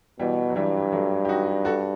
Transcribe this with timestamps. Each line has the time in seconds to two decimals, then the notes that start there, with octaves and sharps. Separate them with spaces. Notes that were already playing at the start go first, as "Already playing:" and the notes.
0.19 B2 E3 G3
0.50 F#3
0.56 G2 E3 G3
0.92 F#3 A3
1.25 G4
1.29 D#4 F#4
1.65 F#4 A4